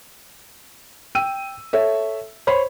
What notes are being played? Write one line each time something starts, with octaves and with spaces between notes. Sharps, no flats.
G5 E6 D#7
A4 C#5 E5
C5 C#5 B5